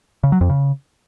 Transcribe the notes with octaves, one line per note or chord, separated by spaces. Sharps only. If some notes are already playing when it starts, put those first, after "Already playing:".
C#3
F#3
F2
C#3